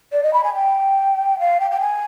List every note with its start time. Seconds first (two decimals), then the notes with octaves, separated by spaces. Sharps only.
0.12 D5
0.23 D#5
0.33 B5
0.44 G#5
0.55 G5
1.39 F5
1.60 G5
1.71 G5
1.81 G#5